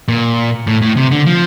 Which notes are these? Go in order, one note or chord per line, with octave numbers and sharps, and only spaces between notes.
A#2
A2
A2
C3
D3
F3